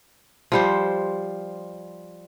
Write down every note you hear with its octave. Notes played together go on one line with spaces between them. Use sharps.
F3 G3 C5